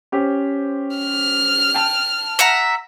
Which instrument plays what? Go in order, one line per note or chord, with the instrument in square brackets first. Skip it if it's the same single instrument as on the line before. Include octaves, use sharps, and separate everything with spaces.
[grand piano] C#4 G4 C5
[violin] F6
[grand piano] G5 A5
[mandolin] E5 F#5 A#5